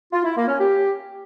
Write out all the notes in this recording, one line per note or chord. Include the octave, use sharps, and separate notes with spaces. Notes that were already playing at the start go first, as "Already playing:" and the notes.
F4
E4
A#3
C#4
G4